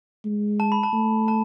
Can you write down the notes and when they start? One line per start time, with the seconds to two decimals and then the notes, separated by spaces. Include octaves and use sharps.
0.25 G#3
0.60 A5
0.72 B5
0.83 A5
0.93 A3
1.28 A5